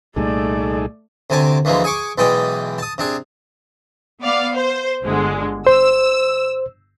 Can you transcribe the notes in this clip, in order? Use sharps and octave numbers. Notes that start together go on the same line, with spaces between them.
C2 A#2 G3 A3 D#4 G#4 A4 D5
D2 C3 G#5 A5 D6
D2 E3 F3 G#3 A#3
G#4 G#5 C#6 D6
B1 E3 G#3 D5 G5 D#6
A5 D#6
C3 D4 G#4
B3 D5 F5
C5
G1 D3 G#3
C5 E6